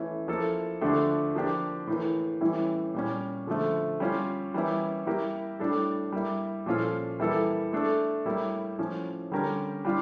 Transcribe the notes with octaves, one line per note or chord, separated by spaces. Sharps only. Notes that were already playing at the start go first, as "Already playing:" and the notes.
Already playing: E3 A3 C#4 E4
F3 A#3 E4 A4
D3 F3 A3 D4 G4
F3 A#3 D4 G4
A2 E3 A#3
A2 E3 G3 C#4 E4
A#2 G3 C#4
D3 F3 A3
G3 C#4 F4
E3 G3 A#3 C#4 E4
G3 A#3 E4 G4 A#4
A2 G3 D4 A4
G3 A#3 E4
A#2 F3 C#4 F4 A4
E3 G3 A#3 E4 A4
A3 D4 A4
A2 G3 A#3 E4
A2 F3 C#4
D3 G3 C#4 G4 A#4
G3 D4 F4